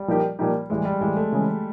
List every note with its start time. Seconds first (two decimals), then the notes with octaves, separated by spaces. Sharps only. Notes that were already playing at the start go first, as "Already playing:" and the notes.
Already playing: G3
0.08 A#2 F3 A#3 D#4 G4
0.39 A#2 F3 A#3 D#4 G4
0.70 A2 E3 G3 G#3
0.85 G3
1.01 A2 E3 G3 G#3
1.17 A3
1.32 C#3 E3 G#3